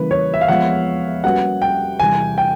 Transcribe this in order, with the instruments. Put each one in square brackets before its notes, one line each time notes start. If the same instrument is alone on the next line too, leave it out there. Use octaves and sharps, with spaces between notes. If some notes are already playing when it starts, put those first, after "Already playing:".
Already playing: [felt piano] C#3 E3 G3 A#3 [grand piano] B4
[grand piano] C#5
E5
F5
[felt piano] F3 G#3 B3 [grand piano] F#5
[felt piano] G3 A#3 C#4 F#4 B4 [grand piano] F#5
[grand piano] G5
[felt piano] C3 E3 G3 [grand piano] G#5
[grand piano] G5